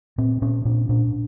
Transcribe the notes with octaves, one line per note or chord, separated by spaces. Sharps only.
A#2 C4
A#2 C#4
A#2 D4
A#2 D4